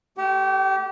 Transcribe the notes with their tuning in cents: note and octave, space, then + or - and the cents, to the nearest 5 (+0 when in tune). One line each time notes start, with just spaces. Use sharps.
A3 +0 G4 -25 F#5 +35